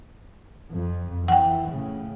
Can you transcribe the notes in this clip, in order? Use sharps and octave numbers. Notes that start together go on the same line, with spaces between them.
F2
E3 F#5 G5
A2 C#3